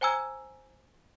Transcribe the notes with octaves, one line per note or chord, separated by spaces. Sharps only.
C5 G5 G#5 A#5 E6 G#6